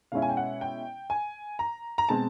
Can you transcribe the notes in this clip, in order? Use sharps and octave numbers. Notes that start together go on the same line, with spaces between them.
B2 G#3 C#4 E4 F5
G#5
G5
F#5
G5
G#5
A#5
A#5
B2 G#3 C4 A5